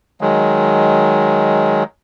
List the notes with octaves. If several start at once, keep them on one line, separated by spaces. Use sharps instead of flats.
D#3 F#3 G#3